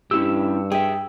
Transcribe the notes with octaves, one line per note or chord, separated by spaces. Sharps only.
G2 C#4 E4 G4 E6
G#4 E5 G5